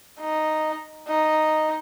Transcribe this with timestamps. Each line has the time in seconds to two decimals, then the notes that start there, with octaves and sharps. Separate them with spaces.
0.20 D#4
1.08 D#4